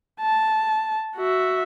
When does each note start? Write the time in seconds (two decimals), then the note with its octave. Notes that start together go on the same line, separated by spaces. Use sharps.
0.21 A5
1.17 F#4 E5